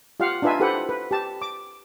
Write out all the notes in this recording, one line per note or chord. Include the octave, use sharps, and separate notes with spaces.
F4 G4 F5 F#5
D4 D#4 F4 B4 E5 G#5
E4 G4 A4 B4 C5 F#5
B4
G4 A5
D6